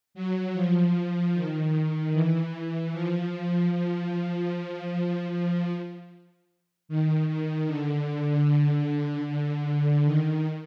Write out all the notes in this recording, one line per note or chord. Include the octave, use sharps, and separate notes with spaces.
F#3
F3
D#3
E3
F3
F3
F3
D#3
D#3
D3
D3
D#3